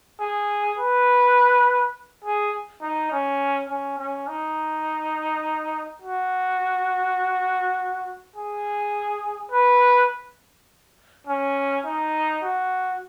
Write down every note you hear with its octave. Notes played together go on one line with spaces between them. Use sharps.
G#4
B4
G#4
D#4
C#4
C#4
C#4
D#4
F#4
G#4
B4
C#4
D#4
F#4